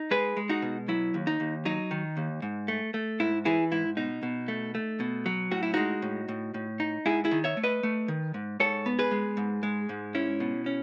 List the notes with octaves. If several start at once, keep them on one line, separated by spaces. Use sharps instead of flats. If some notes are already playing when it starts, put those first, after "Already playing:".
Already playing: D#4
G#3 G#4 B4
G#3
D#4 F#4
B2
F#3 E4
D#2
D#4
D#2
F#3 D#4
D#3
D#2
G#2
A3
A3
G#2 E4
E3 E4 G#4
G#2 E4
B2 D#4
B2
A3
A3
B2
F#3
A2 F#4
E4
G#3 D#4 F#4
A2
A2
A2
D#4
G#2 E4 G#4
E4 G#4
D#3
C#5 E5
A3
B4 D#5
A3
D#3
G#2
G#2 A4 C#5
B3
G#4 B4
G#3
G#2
G#3
G#2
C#4 E4
B2
C#4